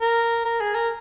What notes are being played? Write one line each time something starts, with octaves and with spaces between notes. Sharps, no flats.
A#4
A#4
G#4
A#4